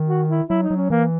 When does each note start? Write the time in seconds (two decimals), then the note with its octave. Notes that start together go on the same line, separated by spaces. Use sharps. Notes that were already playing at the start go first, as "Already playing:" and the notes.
Already playing: D#3
0.08 F#4
0.29 E4
0.49 F#3 E4
0.63 D#4
0.70 F#3
0.77 C#4
0.90 E3 A#3